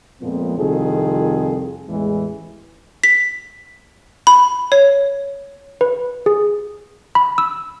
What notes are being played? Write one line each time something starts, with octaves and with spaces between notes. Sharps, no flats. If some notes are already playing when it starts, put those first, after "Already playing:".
F2 A#2 F3 G#3 B3 C4
C2 F2 D#3 F4 G#4 A4
A1 E2 E3 G#3
B6
B5
C#5
B4
G#4
B5
E6